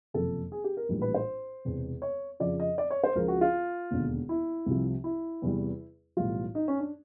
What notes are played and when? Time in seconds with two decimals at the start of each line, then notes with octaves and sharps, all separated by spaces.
0.14 F#1 F2 C3 F3 A4
0.52 G#4
0.64 G4
0.77 A#4
0.89 A#1 A2 E3 G3
1.02 B4
1.14 C5
1.65 E1 E2 C3
2.02 C#5
2.40 F2 C#3 F3 D5
2.60 D#5
2.78 D5
2.90 C#5
3.04 C5
3.15 C#2 C#3 F3 A#4
3.28 F#4
3.41 F4
3.91 E1 D#2 D3
4.29 E4
4.66 C2 C3 F3
5.04 E4
5.42 E2 C3 E3 G3
6.17 B1 A2 E3 G3 F4
6.55 D#4
6.68 C#4
6.80 D4